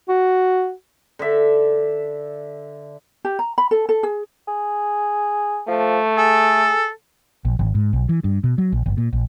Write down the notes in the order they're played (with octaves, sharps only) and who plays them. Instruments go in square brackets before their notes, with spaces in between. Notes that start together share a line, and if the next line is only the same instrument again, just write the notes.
[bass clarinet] F#4
[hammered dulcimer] D3 E5
[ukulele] G4
A#5
B5
A4
A4
G#4
[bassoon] G#4
[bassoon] F3 [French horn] A3
[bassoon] G#4 [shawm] A4
[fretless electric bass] A#1
G#1
G#2
B1
E3
G2
B2
F#3
A#1
G1
A#2
A#1